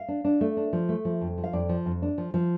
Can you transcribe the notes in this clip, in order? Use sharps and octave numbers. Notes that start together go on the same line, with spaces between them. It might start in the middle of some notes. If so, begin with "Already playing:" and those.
Already playing: F5
D4
D4
A3
D4
F3
A3
F3
F2
F3
F5
F2 D5
F3
F2
D4
F3
F3